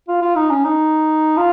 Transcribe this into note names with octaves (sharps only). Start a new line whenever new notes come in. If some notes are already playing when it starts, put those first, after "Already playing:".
F4
F4
D#4
C#4
D#4
F4